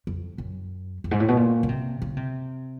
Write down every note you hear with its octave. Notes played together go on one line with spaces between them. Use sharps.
F2
F#2
F2
G#2
A2
B2
A#2
C#3
C3
C#3
C3